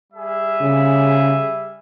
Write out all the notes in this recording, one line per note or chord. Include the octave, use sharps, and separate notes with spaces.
G3 G#4 E5
C#3